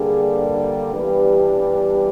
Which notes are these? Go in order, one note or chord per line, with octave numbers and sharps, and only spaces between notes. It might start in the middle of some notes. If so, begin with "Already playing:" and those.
Already playing: G2 D3 G3 A#3 D4 G#4
G2 E3 G3 B3 D4 G4